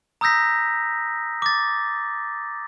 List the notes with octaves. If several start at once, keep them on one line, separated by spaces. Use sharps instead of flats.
A#5 D#6 E6 G6 A#6 B6
D6 A6